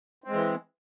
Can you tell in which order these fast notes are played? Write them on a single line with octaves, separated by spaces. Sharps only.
C4 G#3 E3